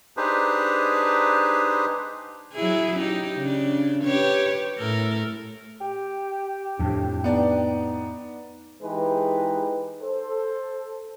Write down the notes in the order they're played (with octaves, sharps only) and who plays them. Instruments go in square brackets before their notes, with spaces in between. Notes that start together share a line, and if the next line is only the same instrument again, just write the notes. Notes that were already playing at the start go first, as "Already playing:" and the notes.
[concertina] D4 D#4 G4 G#4 B4 C5
[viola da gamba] F#3 E4 G#4
D#4 G4
C#3 D4
G4 B4 C#5
A2 A4 A#4
[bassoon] G4
[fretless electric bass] F2 A2 [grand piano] C3 [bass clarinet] D4
[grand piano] B3 D4 D5 [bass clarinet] D#4
[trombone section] E3 G#3 D#4 G4 G#4 B4
A4 C5